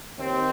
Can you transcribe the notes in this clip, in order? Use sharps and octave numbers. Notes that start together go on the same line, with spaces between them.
D#2 C4